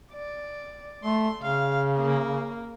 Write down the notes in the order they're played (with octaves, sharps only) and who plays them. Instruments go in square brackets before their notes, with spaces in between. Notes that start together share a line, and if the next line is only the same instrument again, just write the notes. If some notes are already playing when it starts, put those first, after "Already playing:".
[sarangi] D5
[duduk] A3 [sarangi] C6
[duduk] C#3 [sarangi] F5
[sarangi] A#3